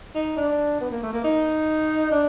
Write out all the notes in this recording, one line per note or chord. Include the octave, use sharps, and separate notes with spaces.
D#4
D4
B3
A#3
A3
A#3
D#4
D4